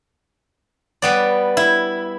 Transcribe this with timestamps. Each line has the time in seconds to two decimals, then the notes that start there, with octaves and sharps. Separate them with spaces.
1.02 G3 B3 D5
1.57 E4